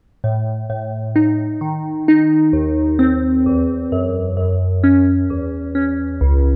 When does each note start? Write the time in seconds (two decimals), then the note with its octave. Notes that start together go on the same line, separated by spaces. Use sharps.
0.24 A2
0.70 A2
1.16 D#4
1.61 D#3
2.08 D#4
2.53 D#2
2.99 C4
3.46 E2
3.92 F#2
4.37 F#2
4.84 C#4
5.30 E2
5.75 C#4
6.21 C#2